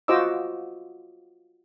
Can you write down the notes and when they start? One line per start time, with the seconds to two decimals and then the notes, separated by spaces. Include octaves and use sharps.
0.08 F4 F#4 C5 D#5 D6 E6